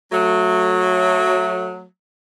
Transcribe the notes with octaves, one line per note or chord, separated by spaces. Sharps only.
F#3 A3